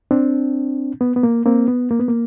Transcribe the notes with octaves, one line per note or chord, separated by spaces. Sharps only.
C4 D4
B3
B3
A#3
A#3 C4
B3
A#3
B3
A#3